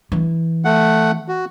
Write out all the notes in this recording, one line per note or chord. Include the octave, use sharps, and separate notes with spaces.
E3
A3 F#5
F#4